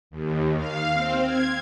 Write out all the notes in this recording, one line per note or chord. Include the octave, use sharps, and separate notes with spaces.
D#2
F5
C4
G#6